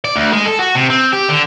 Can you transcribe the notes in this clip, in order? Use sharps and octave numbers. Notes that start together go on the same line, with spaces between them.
D5
D2
G#3
A4
F#4
C3
C4
G4
D3